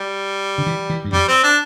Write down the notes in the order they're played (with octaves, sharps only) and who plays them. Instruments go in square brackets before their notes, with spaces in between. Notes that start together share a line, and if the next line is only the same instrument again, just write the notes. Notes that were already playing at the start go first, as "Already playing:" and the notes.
Already playing: [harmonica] G3
[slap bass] D3
E3
E3
G2
[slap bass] F2 [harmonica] G3
[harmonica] C4
D4